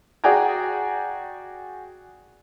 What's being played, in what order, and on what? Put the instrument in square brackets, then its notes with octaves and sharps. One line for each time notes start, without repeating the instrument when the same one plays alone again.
[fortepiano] F#4 G#4 D5 G5 G#5 A#5